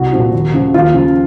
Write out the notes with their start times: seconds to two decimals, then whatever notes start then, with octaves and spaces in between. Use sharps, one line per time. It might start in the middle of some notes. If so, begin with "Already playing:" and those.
Already playing: C2 F#4
0.13 A#2 F3
0.33 D#2
0.53 C#3 F3
0.74 D#2 F4
0.94 C#3 F3